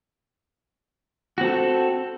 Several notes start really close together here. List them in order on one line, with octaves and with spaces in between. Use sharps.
F#4 C4 A4